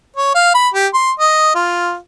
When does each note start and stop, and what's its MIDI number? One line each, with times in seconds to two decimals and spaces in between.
0.16 0.32 73
0.35 0.52 77
0.54 0.68 83
0.74 0.87 67
0.94 1.11 84
1.20 1.50 75
1.55 1.96 65